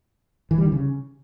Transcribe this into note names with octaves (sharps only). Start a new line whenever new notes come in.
E3
G3
D#3
C#3